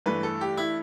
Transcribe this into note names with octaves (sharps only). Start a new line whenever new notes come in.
G2 E3 A3 B4
A4
G4
E4